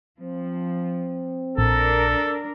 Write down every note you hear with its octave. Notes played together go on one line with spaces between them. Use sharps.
F3 C4
A#1 D4 A4 A#4